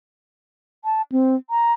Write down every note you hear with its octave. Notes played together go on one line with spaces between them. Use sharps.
A5
C4
A#5